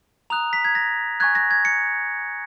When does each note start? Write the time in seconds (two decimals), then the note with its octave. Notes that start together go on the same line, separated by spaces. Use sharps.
0.30 A#5 D#6 F#6 F7
0.53 B6
0.65 G#6
0.75 A#6
1.20 G#5 C#6 F#6 G#6
1.35 A#6
1.51 G#6
1.65 C#7